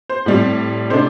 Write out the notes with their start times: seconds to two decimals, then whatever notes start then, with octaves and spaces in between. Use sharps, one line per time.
0.09 C5
0.26 A2 G3 C4
0.90 C3 A3 D4 C5